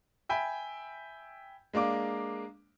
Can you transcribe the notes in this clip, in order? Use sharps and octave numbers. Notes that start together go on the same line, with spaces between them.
E5 G5 G#5 B5
G#3 A#3 D4 D6